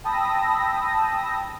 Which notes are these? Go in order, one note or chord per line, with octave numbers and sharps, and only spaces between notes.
G5 A5 B5 D#6 E6 A#6